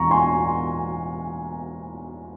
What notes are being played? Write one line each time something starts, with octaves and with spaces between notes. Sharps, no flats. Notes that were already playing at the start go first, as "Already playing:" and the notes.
Already playing: E1 E2 E3 A#5 C#6
G#5 C6